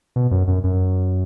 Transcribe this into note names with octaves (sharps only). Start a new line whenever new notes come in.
B2
F#2
F#2
F#2